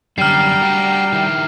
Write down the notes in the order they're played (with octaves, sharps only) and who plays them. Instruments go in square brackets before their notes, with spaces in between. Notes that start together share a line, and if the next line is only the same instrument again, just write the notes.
[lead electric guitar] F#2 D3 [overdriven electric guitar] G3 [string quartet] G5 A#5 [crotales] F6 C7
[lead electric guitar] D4 F#4
D#3 E4